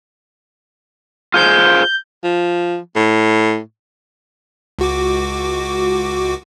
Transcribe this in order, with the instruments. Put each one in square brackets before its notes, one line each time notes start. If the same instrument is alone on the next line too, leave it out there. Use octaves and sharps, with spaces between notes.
[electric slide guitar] F4 G#4 C5 [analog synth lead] G6
[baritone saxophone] F3
A2
[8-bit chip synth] C#2 F#4 D6